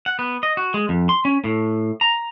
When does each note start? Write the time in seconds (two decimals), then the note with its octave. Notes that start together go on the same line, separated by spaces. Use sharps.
0.06 F#5
0.19 B3
0.43 D#5
0.57 F#4
0.74 G#3
0.89 F2
1.09 C6
1.25 C#4
1.44 A2
2.01 A#5